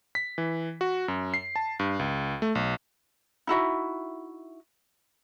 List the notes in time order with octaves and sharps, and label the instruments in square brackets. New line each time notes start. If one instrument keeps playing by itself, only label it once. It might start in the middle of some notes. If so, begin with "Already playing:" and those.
[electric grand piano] B6
E3
F#4
F#2
C7
A5
G2
C#2
A3
B1
[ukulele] D#4 E4 F#4 E5